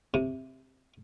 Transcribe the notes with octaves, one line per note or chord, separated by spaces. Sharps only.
C3